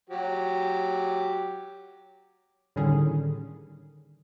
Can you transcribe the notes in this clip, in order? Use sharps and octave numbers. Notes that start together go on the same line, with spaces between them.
F#3 G4
A2 D3 D#3 G3 C#4 G#4